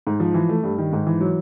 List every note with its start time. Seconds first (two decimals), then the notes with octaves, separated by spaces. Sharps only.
0.07 G#2
0.20 F3
0.34 E3
0.49 A3
0.64 G2
0.78 D#3
0.93 G#2
1.07 E3
1.21 F#3